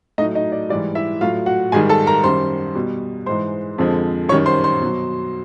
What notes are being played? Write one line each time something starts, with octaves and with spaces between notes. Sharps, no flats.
A2 F#3 D#4 D#5
D#4 D#5
D5
G#2 E3 G3 D5
E4 E5
A2 F#3 F4 F5
F#4 F#5
G#2 D#3 G3 G#4 G#5
A4 A5
A#4 A#5
F#2 D#3 G3 C5 C6
B2 G3
G#2 E3 G#3 C5 C6
F2 D3 F3 G#3
F#2 D#3 G3 C#5 C#6
C5 C6
C5 C6
B2 F#3